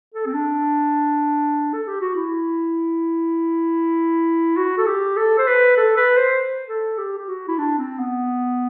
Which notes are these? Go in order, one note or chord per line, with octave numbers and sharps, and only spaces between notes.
A4
C4
D4
A4
G4
F#4
E4
F#4
A4
G4
A4
C5
B4
A4
B4
C5
A4
G4
G4
F#4
E4
D4
C4
B3